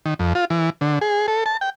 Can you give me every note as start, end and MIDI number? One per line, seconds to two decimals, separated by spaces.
0.06 0.14 51
0.19 0.33 41
0.35 0.45 65
0.50 0.70 52
0.81 0.99 50
1.01 1.26 68
1.28 1.44 69
1.46 1.57 81
1.61 1.70 79